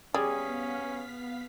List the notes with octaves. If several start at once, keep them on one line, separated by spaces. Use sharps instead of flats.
G3 B3 C#4 G#4 F5 B6